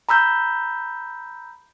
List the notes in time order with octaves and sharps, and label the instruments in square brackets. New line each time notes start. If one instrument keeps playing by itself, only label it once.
[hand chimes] A#5 B5 E6 G6